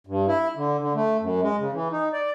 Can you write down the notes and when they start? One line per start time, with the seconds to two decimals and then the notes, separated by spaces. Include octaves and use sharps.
0.07 G2
0.28 E4
0.56 D3
0.81 D3
0.94 A3
1.21 F#2
1.42 G#3
1.59 C#3
1.73 E3
1.92 D#4
2.13 D5